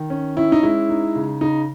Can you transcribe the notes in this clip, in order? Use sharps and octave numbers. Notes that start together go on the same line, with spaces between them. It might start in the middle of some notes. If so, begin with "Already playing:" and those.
Already playing: D#3
C#4
C#4 E4
D#4
G#3 E4
D#4
C#3
C#3 D#4